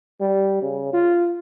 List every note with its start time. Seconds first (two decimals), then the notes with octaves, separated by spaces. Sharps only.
0.20 G3
0.62 C#3
0.93 F4